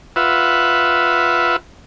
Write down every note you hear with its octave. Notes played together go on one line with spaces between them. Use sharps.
F4 B4 E5 F#5